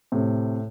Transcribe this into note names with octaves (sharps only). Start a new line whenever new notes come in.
A2 C3